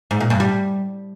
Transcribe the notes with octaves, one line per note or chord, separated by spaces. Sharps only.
G#2
A#2
G2
G3